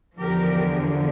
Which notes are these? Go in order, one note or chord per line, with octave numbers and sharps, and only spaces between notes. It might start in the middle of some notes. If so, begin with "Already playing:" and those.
E2 D3 F3 G4 A#4